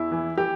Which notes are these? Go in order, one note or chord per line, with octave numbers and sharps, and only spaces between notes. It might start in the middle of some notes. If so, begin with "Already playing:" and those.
Already playing: E2 E4
E3
E3 G4